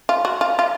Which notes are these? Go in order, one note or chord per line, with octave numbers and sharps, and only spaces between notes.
F4
F#4
F4
F4